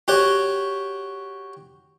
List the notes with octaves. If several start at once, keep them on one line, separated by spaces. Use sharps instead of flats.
F#4 G4 C#5 F#5